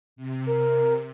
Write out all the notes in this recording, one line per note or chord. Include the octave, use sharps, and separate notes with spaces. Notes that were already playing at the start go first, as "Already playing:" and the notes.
C3
A#4